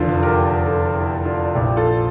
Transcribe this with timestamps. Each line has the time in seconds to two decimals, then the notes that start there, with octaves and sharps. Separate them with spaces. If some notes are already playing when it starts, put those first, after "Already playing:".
Already playing: F1 E2 D3 F3 F4 A4
0.23 G4 A#4
0.66 F4 A4
0.96 E4 G4
1.25 D4 F4
1.55 A#1 A#2 F3 E4 G4
1.76 F4 A4